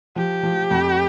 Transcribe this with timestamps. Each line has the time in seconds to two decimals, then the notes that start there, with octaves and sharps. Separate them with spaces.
0.16 F3 G4
0.43 F3
0.71 F2